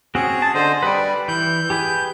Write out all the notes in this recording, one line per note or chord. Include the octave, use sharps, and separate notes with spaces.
C4 C#4 F#4 G#4
A5
D3 C5 D#5
G3 B4 D5
E3 G6
G4 G#4 B4